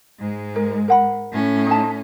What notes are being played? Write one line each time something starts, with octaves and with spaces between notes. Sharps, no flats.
G#2 G#3
A#4
A#4 F#5 B5
A2 C#4
D#4 A5